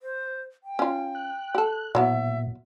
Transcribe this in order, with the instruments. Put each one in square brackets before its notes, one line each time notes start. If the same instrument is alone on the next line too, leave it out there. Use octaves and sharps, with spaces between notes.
[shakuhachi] C5
G5
[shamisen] C#4 F4
[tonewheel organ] F#6
[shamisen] G4 A4
[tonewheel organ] A#2 [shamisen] F#3 B3 E4 [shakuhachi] E5